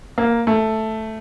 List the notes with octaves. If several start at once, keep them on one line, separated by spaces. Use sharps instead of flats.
A#3
A3